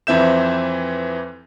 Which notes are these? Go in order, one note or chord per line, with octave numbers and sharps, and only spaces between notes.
F2 E3 C4 E5 G6 E7